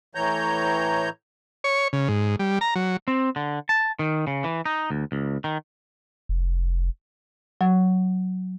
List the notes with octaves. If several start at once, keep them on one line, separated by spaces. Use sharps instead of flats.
A2 E3 C#5 A#5 G6
C#5
C#3
G#2
G3
A#5
F#3
C4
D3
A5
D#3
C#3
E3
D#4
D2
C#2
D#3
F1
F#3